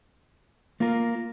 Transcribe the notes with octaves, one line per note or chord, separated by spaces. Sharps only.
A#3 F4 A#4